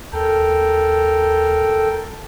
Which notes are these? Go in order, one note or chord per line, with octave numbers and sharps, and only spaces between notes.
D#2 A4 A#4 G5 F6